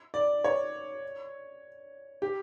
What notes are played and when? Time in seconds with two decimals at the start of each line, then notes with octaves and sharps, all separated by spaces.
0.14 D5
0.44 C#5
2.22 G4